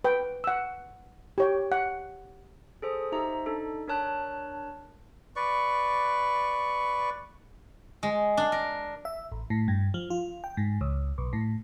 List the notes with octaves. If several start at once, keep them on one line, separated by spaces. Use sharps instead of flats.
B4 G5
F#5 E6
G4 C#5 G5
F#5
G#4 A4 C5 D#6
D#4 G4 C5 E5 A#5
D4 D#4 A4
D4 A#4 C#5 A5 F#6
B4 D5 C#6
G#3
D4
A#4
E5
A1
A2
G2
F3
F4
G5
G#2
C#2
B1
A2